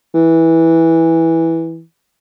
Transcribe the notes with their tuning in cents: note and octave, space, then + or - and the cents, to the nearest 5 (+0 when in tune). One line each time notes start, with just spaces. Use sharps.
E3 -10